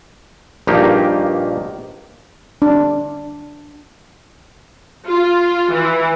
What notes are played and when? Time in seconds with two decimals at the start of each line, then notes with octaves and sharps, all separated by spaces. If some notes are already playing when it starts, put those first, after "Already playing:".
0.67 A#1 G2 D#3 A#3 D#4 G4
2.62 D4
5.07 F4
5.72 E3